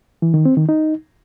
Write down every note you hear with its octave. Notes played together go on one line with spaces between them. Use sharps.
E3
D#3
C4
D#3
D#4